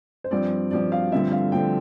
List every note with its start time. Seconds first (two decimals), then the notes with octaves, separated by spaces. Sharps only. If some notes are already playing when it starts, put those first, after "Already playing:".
0.24 C5
0.31 G2 F3 C4 D5
0.71 G2 F3 C4 D5
0.92 F5
1.12 G2 D3 F3 A3 C4 E5
1.32 F5
1.52 D3 F3 A3 C4 G5